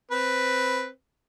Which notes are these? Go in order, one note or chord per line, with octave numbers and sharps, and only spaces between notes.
C4 B4